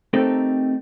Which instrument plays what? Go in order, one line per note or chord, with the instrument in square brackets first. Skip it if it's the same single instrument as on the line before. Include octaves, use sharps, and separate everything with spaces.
[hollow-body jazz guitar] A3 C4 D#4 G4 A4 A#4